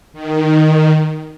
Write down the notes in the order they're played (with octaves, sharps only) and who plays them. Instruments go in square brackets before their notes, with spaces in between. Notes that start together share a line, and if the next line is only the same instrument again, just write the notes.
[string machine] D#3